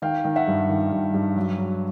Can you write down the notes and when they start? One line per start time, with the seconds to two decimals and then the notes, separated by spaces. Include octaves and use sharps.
0.02 D#3 F5 G5
0.25 D#3
0.36 E5 F#5
0.47 G2
0.69 D#3
0.92 G2
1.14 G2
1.36 F#3
1.58 F#3